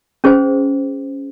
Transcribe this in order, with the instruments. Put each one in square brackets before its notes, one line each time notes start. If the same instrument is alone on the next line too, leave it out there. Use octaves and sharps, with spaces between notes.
[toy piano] C#4 G#4 C5